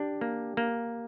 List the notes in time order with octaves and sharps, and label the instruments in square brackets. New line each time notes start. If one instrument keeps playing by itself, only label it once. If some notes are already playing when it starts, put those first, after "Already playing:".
Already playing: [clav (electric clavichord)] D4 [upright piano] G4
[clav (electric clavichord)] A#3
A#3